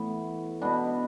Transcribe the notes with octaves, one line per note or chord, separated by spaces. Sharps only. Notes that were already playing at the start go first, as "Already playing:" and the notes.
Already playing: A2 E3 B3
B2 B3 D4